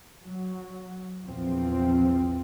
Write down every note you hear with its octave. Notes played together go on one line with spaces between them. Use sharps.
F#3
A#1 E2 F3 C4